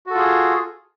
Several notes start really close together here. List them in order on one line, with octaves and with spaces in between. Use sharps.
F#4 A4 F4 G#4